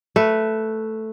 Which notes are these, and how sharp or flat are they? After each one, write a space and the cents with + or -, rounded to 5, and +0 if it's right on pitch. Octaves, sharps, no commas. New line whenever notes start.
A3 +0 B4 +0